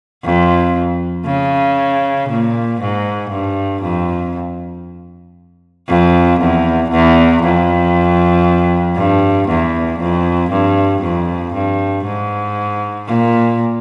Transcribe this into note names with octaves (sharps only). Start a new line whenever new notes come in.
F2
C#3
A#2
G#2
G2
F2
F2
E2
E2
F2
G2
E2
F2
G2
F2
G2
G#2
A#2